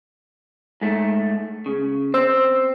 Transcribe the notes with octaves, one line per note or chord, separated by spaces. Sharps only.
G#2 A3
C#3
C4 C5 E6